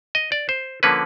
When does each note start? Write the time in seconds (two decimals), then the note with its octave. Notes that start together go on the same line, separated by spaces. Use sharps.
0.15 D#5
0.32 D5
0.49 C5
0.83 D3 F3 A#3 C#4 B4